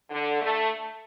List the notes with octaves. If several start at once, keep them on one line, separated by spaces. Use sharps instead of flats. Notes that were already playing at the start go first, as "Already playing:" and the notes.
D3
A3